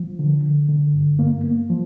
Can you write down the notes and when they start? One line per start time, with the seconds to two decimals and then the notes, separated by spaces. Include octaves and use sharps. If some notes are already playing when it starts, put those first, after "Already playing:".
Already playing: F3
0.19 D3
0.44 D3
0.69 D3
0.94 G2
1.19 A#3
1.44 A#3
1.70 F3